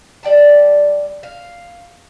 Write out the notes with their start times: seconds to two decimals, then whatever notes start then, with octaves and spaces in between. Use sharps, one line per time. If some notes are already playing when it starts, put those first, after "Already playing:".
0.23 G3 D5 G5 A5
1.23 F5